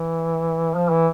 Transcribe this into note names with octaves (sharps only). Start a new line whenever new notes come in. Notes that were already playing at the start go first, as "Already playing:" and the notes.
Already playing: E3
F3
E3